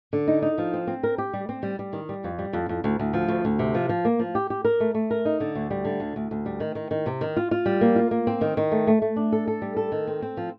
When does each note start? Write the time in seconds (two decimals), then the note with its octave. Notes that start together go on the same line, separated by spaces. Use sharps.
0.13 D3
0.27 D#4
0.42 D#4
0.58 F3
0.73 C4
0.87 C4
1.03 A#4
1.18 G4
1.33 G3
1.49 C4
1.63 G3
1.79 G3
1.93 D#3
2.09 G3
2.24 F2
2.39 G3
2.53 F2
2.69 F2
2.84 D2
2.99 D2
3.13 F3
3.28 D2
3.45 D2
3.59 C3
3.75 F3
3.89 F3
4.05 A#3
4.19 F3
4.35 G4
4.50 G4
4.64 A#4
4.80 A3
4.94 A3
5.10 A#4
5.25 D#4
5.40 D3
5.55 D2
5.71 G3
5.85 D3
6.00 D2
6.16 D2
6.31 D2
6.46 G3
6.60 D#3
6.75 D#3
6.91 D#3
7.06 C3
7.21 D#3
7.36 F4
7.51 F4
7.66 G3
7.81 A#3
7.96 F4
8.11 A#3
8.27 C4
8.41 D#3
8.57 D#3
8.72 A3
8.87 A3
9.02 A3
9.16 D4
9.32 A4
9.47 A4
9.62 G3
9.76 A4
9.92 D#3
10.07 C4
10.22 C4
10.37 F3